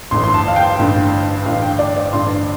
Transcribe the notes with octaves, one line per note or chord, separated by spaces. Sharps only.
A1 G2 D3 C6
C6
A5
F5
G5
A1 G2 D3
A1 G2 D3 F5
G5
D5
D5
A1 G2 D3 C6